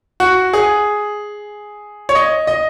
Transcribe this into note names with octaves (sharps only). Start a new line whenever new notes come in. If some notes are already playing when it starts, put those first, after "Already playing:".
F#4
G#4
C#5
D#5
D#5